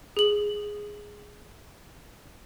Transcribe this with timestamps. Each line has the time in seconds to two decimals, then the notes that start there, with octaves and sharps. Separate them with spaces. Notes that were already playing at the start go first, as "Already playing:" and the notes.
0.17 G#4 F#7